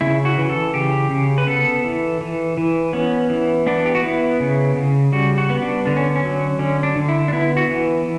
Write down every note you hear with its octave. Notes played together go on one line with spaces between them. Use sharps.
C#3 E4
F#4
E3
A4
C#3 G4
C#3
B4
B3 A4
E3
E3
E3
B3 C#4
E3
B3 D4
G4
F#4
B3 E4
C#3
C#3
G3 F#4
F#4
B3
D4
D3 D4
C#4
C#4
F#3
D3 C#4
D4
D3
E4
D4
B3 E4
F#4
E3